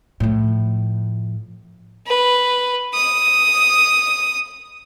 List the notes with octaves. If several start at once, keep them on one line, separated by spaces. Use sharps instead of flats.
A2 F3
B4
D#6